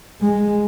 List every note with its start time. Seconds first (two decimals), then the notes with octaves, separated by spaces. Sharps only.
0.22 G#3